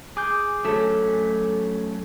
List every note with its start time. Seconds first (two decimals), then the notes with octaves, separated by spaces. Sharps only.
0.17 G#4 D6 G6
0.65 F#3 A3 C#4 A4